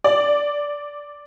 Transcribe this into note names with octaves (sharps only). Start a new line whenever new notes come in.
D5